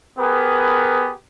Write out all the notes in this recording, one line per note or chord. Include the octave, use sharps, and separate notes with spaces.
B3 G4 G#4 A#4 B4